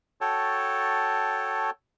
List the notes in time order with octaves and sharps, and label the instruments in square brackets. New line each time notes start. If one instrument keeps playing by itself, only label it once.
[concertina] F#4 A4 C#5 G5 A5